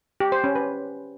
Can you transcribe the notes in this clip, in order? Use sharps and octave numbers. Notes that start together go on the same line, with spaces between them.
G4
C5
C#4
B4